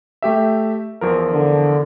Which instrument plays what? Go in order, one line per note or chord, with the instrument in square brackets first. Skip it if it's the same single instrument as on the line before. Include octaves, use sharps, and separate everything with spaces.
[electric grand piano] A3 G4 E5
E2 F3 A#4
[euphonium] D3